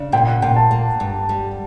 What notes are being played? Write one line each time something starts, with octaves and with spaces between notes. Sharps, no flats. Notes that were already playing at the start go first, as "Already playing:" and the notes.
Already playing: C#3 D4
A#2 G5
F#5
A#2 G5
A5
A#3
G2
G3